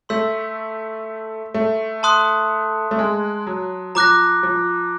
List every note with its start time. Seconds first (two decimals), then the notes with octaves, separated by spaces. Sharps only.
0.09 A3 C6 E6 G6 B6
1.54 A3
2.03 A5 C6 D#6 F#6
2.91 A3
2.99 G#3
3.47 F#3
3.95 F3 A#5 D6 F#6 A#6
4.43 F3